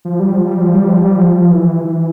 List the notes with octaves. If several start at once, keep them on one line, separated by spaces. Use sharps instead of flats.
F3
G3
F3
G3
F3
G3
F3
G3
F3
E3
E3